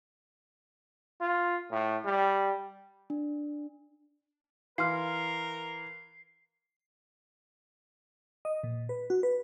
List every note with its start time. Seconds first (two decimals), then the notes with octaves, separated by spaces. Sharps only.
1.21 F4
1.71 A2
2.05 G3
3.10 D4
4.78 E3 A#4 F5 C6 F6 C7
8.45 D#5
8.63 A#2
8.89 B4
9.10 F#4
9.23 B4